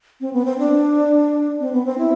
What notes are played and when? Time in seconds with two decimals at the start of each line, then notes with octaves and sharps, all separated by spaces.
0.21 C4
0.33 B3
0.46 C4
0.58 D4
1.60 C4
1.73 B3
1.86 C4
1.98 E4